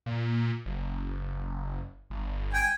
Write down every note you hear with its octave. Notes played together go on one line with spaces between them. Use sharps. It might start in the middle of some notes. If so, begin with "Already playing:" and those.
A#2
F#1
G1
G5 G#5